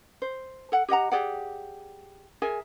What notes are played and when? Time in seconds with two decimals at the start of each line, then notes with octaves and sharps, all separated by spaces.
0.22 C5
0.72 A4 F#5
0.88 G4 D#5 F#5 A#5
1.11 G4 G#4 D5 F#5
2.42 G#4 A#4 E5 G#5